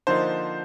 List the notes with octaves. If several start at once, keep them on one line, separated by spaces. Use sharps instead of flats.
D3 F3 A#3 D#4 C5